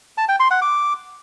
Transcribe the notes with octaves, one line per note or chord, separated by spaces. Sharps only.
A5
G5
C6
F#5
D6